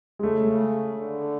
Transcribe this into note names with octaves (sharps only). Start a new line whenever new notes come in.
G#3
C#3 A3
D3